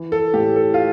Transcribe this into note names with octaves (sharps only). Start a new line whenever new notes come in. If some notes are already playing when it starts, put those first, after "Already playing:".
Already playing: E3
A4
A2 G4
A4
F4